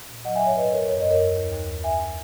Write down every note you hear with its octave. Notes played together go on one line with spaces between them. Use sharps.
A#2
F#3 D#5 F#5
E5 G#5
G#2
C#5 E5
E2 B4 D#5
E2 A#4 C#5
F#2 C#5
F#2 D#5
A#4 C#5
D#2
D#2
D#2
D#2
E2 E5 G#5